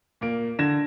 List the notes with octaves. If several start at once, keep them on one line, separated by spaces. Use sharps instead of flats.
A#2 A#3 D7
D3 G#6 A#6 E7